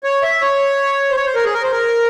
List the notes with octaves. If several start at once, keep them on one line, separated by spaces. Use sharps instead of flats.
C#5
E5
C#5
C5
C#5
C5
A#4
G#4
A#4
C5
A#4